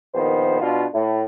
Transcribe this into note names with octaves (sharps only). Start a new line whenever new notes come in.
A#1 D#3 B3 C5
B2 D4 F4
A2